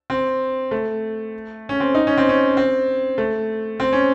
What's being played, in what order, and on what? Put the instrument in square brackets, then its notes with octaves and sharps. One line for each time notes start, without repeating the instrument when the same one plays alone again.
[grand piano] C4
A3
C#4
C4
D#4
C#4
C4
C#4
C4
A3
C4
C#4